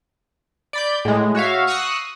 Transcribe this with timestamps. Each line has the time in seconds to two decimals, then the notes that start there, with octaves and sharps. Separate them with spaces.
0.73 D5 B5 G6
1.05 A2 G#3
1.35 F#4 C#5 E5 F5
1.67 C#6 D#6 E6 F#6 A#6 C7